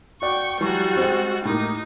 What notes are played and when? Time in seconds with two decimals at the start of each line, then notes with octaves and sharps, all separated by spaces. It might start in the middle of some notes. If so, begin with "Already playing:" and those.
0.22 F#4 D5 G5 C#6
0.61 E3 F#3 G3 F#4
0.97 G#3 C4
1.45 A2 A#3 D#4